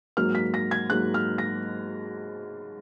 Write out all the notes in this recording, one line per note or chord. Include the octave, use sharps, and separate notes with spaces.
G#2 F#3 A#3 F6
B6
A#6
G#6
G#2 F#3 A#3 F#6
F6
A#6